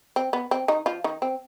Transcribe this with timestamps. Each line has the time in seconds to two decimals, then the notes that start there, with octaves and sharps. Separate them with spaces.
0.16 C4
0.33 B3
0.51 C4
0.68 D#3 D#4
0.86 F3 F4
1.04 D#3 D#4
1.22 C4